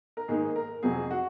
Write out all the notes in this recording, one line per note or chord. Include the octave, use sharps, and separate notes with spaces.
A#4
G#2 D#3 A#3 G#4
A#4
F2 C3 F#3 C4 G#4
F#4